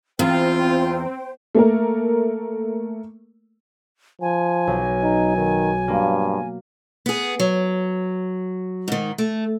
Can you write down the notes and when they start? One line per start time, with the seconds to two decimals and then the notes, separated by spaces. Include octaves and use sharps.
0.19 E2 C4 F4 C5 G5
1.55 A3 A#3 A#4
4.21 F3 G#5
4.67 B1
5.03 D#4
5.37 D#3
5.88 G2 A#3
7.06 B3 G#4
7.40 F#3
8.88 G#2 D#3
9.18 A3